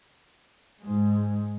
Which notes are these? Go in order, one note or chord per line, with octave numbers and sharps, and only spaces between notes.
G#2 G#3